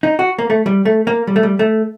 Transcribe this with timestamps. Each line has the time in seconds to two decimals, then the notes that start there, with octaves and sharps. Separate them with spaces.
0.03 D#4
0.19 F#4
0.38 A#3
0.50 A3
0.66 G3
0.85 A3
1.07 A#3
1.27 G3
1.36 A3
1.43 G3
1.59 A3